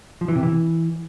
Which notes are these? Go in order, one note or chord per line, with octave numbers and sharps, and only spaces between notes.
F3
E3
C3
E3